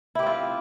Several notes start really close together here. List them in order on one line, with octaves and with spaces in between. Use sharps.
E4 G4 C4 F4